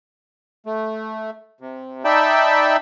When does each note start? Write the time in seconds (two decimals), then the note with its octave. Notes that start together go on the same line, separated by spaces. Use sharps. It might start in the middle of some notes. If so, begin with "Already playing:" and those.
0.66 A3
1.60 C3
2.05 D#4 D5 E5 G5 A5 B5